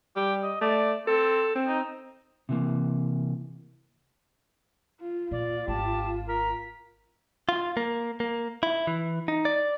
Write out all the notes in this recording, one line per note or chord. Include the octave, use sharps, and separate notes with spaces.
G3 G4
D#5
A3 D5
C4 A4
C4
D#4
C3 E3 A#3
F4
A#2 F4 D5
G#1 G4 A5
A#4 B6
F4
A#3
A#3
E4
E3
D#4
D5